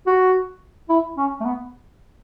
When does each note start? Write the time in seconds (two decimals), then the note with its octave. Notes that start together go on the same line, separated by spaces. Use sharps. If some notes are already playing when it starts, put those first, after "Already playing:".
0.07 F#4
0.89 E4
1.17 C#4
1.40 A3
1.45 B3